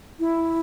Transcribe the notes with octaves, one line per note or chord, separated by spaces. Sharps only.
E4